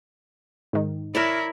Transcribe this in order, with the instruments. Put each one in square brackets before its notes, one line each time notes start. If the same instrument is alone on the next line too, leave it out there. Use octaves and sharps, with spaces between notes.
[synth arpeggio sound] G#2 D#3
[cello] E4 [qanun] A#4 C#5 D5 [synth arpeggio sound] F6 E7